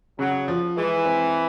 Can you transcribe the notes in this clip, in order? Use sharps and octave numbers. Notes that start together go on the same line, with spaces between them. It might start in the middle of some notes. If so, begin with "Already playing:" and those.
C#3 F#3
F3
E3 G#3
C4